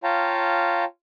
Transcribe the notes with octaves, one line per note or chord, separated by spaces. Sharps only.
F4 C#5 F5 G5 A5 A#5